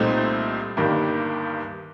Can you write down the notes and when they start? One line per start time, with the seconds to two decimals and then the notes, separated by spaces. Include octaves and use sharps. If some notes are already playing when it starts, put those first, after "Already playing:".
Already playing: C2 A#2 A3 C4 D#4
0.77 G1 G2 D#3 G3 A#3